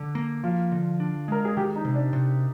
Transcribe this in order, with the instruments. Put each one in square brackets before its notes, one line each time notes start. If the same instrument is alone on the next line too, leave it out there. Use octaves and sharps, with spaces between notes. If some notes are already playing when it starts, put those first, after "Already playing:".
Already playing: [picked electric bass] D3
A#3
[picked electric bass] F3 [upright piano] F4
[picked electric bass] D3
D4
[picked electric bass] G#3 [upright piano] A#4
[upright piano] G#4
[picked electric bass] D#3 [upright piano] G4
[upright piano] D#4
[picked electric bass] C3
[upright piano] D4
[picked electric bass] C3